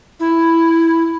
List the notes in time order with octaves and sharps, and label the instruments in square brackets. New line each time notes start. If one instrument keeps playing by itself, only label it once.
[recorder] E4